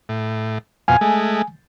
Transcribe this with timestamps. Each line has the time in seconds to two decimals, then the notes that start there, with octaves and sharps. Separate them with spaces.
0.09 A2
0.88 F2 B2 F5 G#5
1.01 G#3 A3